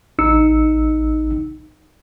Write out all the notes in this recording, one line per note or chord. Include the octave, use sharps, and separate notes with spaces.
A1 D#4 E6 C#7